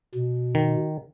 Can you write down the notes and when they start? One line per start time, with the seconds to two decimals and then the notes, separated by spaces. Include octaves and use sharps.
0.15 B2
0.55 D#3